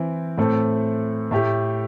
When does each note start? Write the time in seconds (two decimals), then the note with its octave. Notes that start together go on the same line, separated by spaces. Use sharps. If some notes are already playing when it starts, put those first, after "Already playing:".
Already playing: E3 C4 E4
0.38 A2 A3 C4 A4
1.31 A2 A3 E4 G4